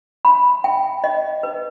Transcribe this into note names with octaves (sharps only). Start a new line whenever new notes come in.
B5
G5
D#5
B4